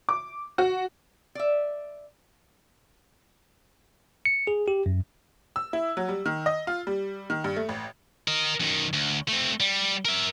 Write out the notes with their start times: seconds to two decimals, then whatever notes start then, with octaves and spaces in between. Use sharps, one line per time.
0.09 D6
0.58 F#4
1.35 D5 E5
4.25 C#7
4.47 G#4
4.68 G4
4.86 F#2
5.56 E6
5.73 E4
5.97 F#3
6.09 G3
6.26 D#3
6.46 D#5
6.67 F4
6.87 G3
7.30 D#3
7.44 G2
7.56 A3
7.69 A1
8.28 A#4 D#5
8.60 F#2 D#3
8.93 D2
9.28 A3 C4
9.60 G3
10.05 A#4 E5